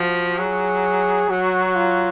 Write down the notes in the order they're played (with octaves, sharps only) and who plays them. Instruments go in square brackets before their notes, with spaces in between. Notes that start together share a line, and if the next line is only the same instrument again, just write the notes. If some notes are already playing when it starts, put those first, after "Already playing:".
Already playing: [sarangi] F3 [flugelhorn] F#4
[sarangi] F#3 [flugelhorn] G#4
[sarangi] F#3 [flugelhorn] F#4
[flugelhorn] F4